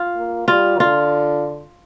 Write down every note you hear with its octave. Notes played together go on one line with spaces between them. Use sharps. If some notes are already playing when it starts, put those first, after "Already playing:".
Already playing: F4
A#3
G3 F4
D3 F4